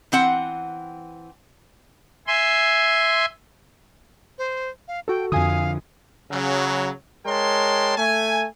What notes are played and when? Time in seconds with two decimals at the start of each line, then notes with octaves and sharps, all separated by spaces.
0.12 E3 C4 F#5
2.27 E5 G#5 C6
4.38 C5
4.88 F5
5.08 F#4 A4 G5
5.32 F2 D3 F3 F5 G#5 D#6
6.31 C#3 F#3
7.26 G#3 A#4 C#5 G5 A5 C6
7.97 A3 G#5